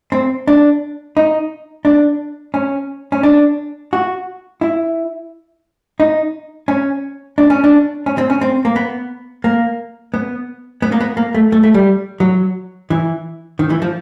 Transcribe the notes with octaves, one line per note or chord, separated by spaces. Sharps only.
C4
D4
D#4
D4
C#4
C#4
D4
F#4
E4
D#4
C#4
D4
C#4
D4
C#4
C4
C#4
C4
A#3
B3
A#3
B3
B3
A#3
B3
A#3
A3
A3
A3
G3
F#3
E3
D#3
E3
F3